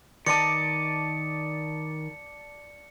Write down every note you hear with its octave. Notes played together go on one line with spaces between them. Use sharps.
D#3 D5 D#5 A5 D6 C#7